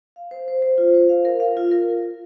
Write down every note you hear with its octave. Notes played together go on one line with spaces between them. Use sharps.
F5
C5
C5
C5
F4
C5
F5
A#4
F5
F4
A#4